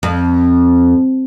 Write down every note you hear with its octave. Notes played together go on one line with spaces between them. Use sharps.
F2